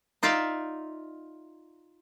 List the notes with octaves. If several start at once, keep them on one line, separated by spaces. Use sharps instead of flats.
D#4 F4 D5 E5 F5